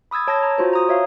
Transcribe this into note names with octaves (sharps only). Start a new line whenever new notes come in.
B5 D#6 E6 G#6 A6
C#5 A5 E6 A6 A#6
A#5
F4 F#4 C5
A#5 D#6
C#5 E5 F5